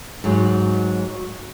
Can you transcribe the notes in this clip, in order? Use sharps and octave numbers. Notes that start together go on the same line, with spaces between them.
G#2 F#3